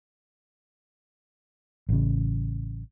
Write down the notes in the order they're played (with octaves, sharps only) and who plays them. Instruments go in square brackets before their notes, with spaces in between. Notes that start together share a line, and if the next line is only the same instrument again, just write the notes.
[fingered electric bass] A1 C#3